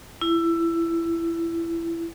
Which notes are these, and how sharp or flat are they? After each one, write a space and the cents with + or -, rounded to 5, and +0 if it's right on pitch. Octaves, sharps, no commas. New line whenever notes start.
E4 +20